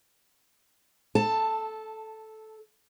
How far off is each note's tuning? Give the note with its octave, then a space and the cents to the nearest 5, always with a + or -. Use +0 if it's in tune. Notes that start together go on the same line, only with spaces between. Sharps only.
A4 -10 A5 +10